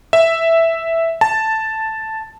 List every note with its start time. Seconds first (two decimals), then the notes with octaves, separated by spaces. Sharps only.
0.13 E5
1.21 A5